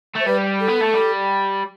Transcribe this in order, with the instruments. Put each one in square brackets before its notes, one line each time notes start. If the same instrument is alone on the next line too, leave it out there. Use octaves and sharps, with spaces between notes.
[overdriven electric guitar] A3 [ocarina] C5
[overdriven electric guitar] G3 [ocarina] B4
[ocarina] A4
[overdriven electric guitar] B3
A3
G3